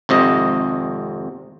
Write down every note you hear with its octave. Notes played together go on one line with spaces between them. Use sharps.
G#1 F2 C3 D#5